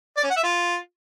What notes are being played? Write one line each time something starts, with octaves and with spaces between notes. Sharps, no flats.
D5
C#4
F#5
E5
F4